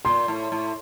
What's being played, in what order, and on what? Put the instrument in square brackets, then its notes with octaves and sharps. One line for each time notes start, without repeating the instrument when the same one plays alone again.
[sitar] A#2 [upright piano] C6
[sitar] A2
A2